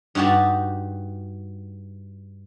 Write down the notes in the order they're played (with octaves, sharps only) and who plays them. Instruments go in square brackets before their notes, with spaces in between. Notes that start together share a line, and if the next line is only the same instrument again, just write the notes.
[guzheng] G2 D#4 F#4 G4 A5